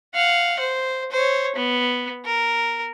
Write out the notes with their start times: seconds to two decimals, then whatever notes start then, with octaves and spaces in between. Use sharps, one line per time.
0.15 F5 F#5
0.60 C5
1.11 C5 C#5
1.56 B3
2.25 A#4